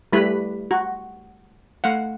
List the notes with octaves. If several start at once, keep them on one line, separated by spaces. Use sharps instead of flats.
G3 A3 E4 B4 B5
F#4
A3 F5 F#5